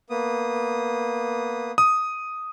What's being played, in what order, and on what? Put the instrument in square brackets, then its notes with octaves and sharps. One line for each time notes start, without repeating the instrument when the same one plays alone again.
[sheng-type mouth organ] A#3 B3 D#6
[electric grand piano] D#6